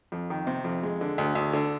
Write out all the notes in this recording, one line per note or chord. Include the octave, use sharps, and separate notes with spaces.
F2
D#3
C3
F2
G#3
D3
D2
D2
D3